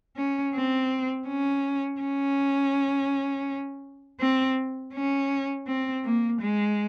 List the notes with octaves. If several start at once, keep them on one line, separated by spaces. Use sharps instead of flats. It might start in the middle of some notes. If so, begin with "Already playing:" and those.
C#4
C4
C#4
C#4
C4
C#4
C4
A#3
G#3